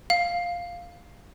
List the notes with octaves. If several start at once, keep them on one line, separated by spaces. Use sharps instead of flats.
F5